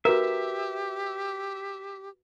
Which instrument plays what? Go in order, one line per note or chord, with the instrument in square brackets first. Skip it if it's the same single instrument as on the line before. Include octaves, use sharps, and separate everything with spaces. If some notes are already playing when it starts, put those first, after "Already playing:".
[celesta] F#4 B4 [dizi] G4 [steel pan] A#4 [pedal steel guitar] E5